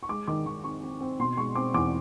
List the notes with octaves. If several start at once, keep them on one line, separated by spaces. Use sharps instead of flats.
C#6
G#3 D6
D#3 D6
D#3 C#6
C4 C#6
C4
C4
B2 C6
G#3 C#6
C4 D6
E2 D6